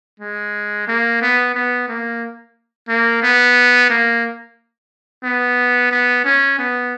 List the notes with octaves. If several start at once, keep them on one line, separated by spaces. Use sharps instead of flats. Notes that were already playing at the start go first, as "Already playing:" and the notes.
G#3
A#3
B3
B3
A#3
A#3
B3
A#3
B3
B3
C#4
B3